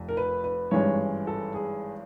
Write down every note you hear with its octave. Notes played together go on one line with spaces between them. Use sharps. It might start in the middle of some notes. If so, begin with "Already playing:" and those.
Already playing: F1 F2
A#4
B4
B4
G#1 G2 E3 G#3 C#4 C#5
A4
G#4